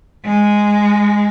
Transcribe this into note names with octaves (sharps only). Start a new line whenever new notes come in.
G#3